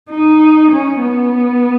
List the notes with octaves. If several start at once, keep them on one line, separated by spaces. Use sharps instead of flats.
D#4
C#4
B3